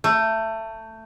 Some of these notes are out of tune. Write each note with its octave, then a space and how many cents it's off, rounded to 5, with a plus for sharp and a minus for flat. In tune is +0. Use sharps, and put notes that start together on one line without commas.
A3 +20